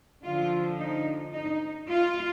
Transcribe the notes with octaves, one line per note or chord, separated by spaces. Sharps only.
D3 F3 F4
D#4
D#4
F4